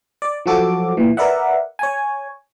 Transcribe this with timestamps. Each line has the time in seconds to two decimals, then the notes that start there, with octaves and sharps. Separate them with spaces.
0.22 D5
0.46 F3 F#3 F#4 A4 D6
0.97 A#2 E3
1.17 A#4 B4 D5 E5 F#5
1.79 C#5 G#5